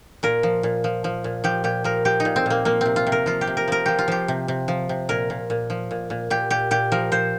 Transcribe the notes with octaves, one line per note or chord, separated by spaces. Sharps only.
A#2 A#4
F3
A#2
F3
F3
A#2
F3 G4
A#2 G4
F3 A#4
F3 G4
D#4
A#2
C4
A#2 A#3
F3 A#3
C3 C4
F4
C3
A#4
F3 F4
G4
C3
A#4
F3 A#4
F3 G4
F4
F3 G4
C3
C3
F3
C3
A#2 A#4
A#2
A#2
F3
A#2
A#2
A#2 G4
A#2 G4
A#2 G4
F3 A#4
F3 C5